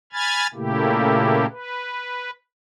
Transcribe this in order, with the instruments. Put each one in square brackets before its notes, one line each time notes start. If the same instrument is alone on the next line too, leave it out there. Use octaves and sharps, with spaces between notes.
[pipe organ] G#5 B5 F6 G#6 A6
A#2 C#3 A3 A#3 E4 G4
B4